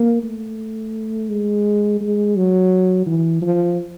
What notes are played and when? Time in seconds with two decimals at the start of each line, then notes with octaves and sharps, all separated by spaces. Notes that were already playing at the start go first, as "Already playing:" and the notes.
Already playing: A#3
0.23 A3
1.29 G#3
2.01 G#3
2.36 F#3
3.06 E3
3.42 F3